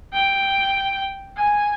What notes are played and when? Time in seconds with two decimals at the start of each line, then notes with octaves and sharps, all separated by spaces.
0.13 G5
1.37 G#5